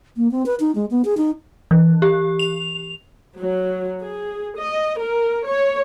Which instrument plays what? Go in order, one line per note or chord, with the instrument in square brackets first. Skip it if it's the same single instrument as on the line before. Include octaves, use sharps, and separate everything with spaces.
[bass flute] A#3
C4
B4
D#4
G#3
B3
G#4
D#4
[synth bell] E3
G4
F7
[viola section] F#3
G#4
D#5
A#4
C#5